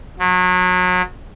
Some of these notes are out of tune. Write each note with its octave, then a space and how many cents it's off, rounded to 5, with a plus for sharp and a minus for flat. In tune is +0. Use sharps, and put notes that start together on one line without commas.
F#3 -30